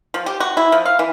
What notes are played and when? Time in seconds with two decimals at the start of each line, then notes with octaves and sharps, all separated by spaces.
0.14 F3
0.26 G4
0.40 F#4
0.57 E4
0.72 F3
0.85 F5
0.99 E3